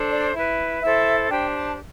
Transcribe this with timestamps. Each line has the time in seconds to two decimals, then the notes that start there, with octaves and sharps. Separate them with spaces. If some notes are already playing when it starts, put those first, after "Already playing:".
Already playing: D4 A4 C5
0.10 D5
0.35 E4 B4
0.82 E4 A4 C5 E5
1.30 D4 G4 C5 G5
1.55 A5